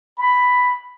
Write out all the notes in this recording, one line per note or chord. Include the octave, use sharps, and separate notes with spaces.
B5